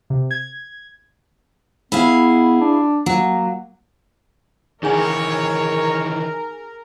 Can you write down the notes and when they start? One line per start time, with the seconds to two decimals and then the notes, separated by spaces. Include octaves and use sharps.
0.10 C3
0.31 G#6
1.92 B3 E4 G#4 F5
2.61 D4
3.06 F#3 A#3
4.83 D#3 E3 D#4 G#4 A#4 C#5 G#5